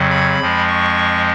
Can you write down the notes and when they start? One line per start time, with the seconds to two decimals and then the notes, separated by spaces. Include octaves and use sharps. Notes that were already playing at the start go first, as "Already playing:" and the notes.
Already playing: F2 C#3 F#3
0.10 B5
0.40 F2 F3 G#3
0.69 C#6